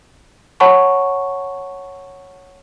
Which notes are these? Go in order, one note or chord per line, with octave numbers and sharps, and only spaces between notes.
C#5 F#5 A5 B5 C#6